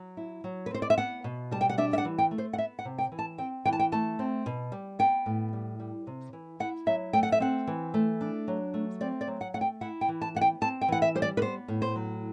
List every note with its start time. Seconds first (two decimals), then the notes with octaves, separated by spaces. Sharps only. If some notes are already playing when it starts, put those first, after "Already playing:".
Already playing: F#3
0.17 E4
0.44 F#3
0.66 B4
0.71 C4 C5
0.82 D5
0.90 E5
0.98 B3 F#5
1.24 B2
1.51 G3 A5
1.61 G5
1.69 F#5
1.78 D4 E5
1.93 E5
1.98 F#5
2.05 E3
2.18 G5
2.31 A3
2.38 C5
2.53 F#5
2.58 B3 E5
2.79 F#5
2.85 C3
2.98 G5
3.12 E3
3.19 A5
3.38 C4 G5
3.65 E3 G5
3.73 A5
3.79 G5
3.92 A3 A5
4.19 C4
4.46 B2
4.72 G3
4.99 B3 G5
5.26 A2
5.53 G3
5.80 G3
6.07 C3
6.33 E3
6.60 E4 F#5
6.86 F#3 E5
7.13 A3 G5
7.23 F#5
7.32 E5
7.40 C4 F#5
7.67 E3
7.94 A3
8.21 D4
8.48 F#3
8.74 A3
9.01 C4 D5
9.21 D5
9.28 F#3
9.41 F#5
9.54 A3 F#5
9.61 G5
9.81 E4 F#5
10.01 G5
10.08 E3
10.22 A5
10.35 B3 F#5
10.41 G5
10.61 C4 A5
10.81 G5
10.88 E3 F#5
11.02 E5
11.15 G3 C5
11.22 D5
11.37 B4
11.42 B3 C5
11.68 A2
11.82 C5
11.96 F#3